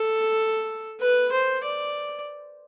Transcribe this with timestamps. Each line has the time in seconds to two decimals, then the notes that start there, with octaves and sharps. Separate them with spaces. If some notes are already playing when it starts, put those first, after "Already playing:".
Already playing: A4
1.01 B4
1.32 C5
1.64 D5